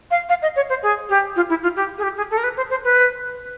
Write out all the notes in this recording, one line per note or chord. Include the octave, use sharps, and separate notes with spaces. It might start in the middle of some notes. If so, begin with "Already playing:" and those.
F5
F5
D#5
C#5
C5
G#4
G4
F4
E4
F4
G4
G#4
G4
G#4
A4
A#4
B4
C5
C5
B4